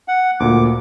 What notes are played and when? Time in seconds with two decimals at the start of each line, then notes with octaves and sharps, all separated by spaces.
0.08 F#5
0.40 D2 A#2 D6